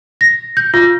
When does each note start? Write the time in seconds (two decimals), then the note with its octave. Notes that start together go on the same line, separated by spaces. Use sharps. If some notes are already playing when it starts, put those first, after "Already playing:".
0.21 A#6
0.57 G6
0.74 F4